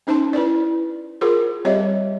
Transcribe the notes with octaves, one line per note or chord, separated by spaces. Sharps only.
C#4 D#4 C5 A5 C6
E4 B4 C5 D5
F4 G#4 A#4 C5
G3 C4 G4 C#5 D#5 E5